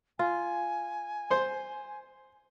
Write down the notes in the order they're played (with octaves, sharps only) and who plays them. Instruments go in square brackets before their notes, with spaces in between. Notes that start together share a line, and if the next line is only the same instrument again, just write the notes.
[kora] F4 [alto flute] G#5
[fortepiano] C5 C6